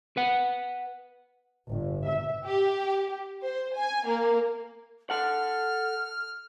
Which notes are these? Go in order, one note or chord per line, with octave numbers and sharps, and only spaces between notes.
B4 F#5
G1
E5
G4
C5
G#5
A#3
A4 F#5 F6